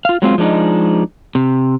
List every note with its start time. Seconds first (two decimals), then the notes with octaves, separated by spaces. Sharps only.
0.05 F4 F5
0.22 F#3 G#3 C4 F4
0.38 F3 G#3 D4 D#4
1.35 C3